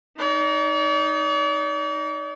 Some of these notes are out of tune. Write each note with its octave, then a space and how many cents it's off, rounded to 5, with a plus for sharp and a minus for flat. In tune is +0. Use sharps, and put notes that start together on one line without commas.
D#4 +0 D5 -45